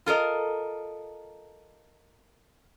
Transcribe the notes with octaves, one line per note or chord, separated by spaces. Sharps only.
F4 A4 A#4 D#5